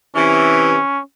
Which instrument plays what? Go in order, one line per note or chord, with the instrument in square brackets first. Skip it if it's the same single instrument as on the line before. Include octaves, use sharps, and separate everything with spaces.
[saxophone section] C3 E3 [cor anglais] C#4